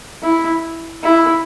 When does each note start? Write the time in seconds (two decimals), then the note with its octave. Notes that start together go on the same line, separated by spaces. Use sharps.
0.23 E4
1.04 E4